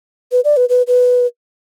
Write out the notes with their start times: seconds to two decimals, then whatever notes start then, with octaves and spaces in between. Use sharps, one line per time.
0.32 B4
0.45 D5
0.57 B4
0.69 B4
0.87 B4